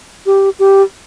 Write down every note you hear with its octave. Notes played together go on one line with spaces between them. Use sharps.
G4
G4